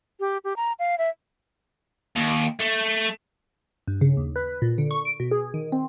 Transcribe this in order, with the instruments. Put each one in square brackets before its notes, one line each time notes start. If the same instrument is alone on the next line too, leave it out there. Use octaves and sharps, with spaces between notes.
[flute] G4
G4
A#5
F5
E5
[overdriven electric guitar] D#2
A3
[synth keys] G2
C#3
D#2
B4
A#2
D3
C#6
D7
B2
G#4
D#3
C4